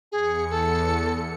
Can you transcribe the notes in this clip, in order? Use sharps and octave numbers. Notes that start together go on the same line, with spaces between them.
E2 G#4 C#7
A4